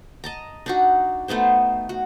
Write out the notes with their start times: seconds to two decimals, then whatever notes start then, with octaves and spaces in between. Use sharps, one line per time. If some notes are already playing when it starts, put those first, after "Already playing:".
0.24 D#5 A5 A#5
0.66 D4 D#4 F#4
1.28 A3 B3 D#4 C5
1.89 F#4